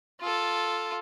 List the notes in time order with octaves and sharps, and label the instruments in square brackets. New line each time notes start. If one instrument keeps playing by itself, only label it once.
[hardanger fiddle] F4 A4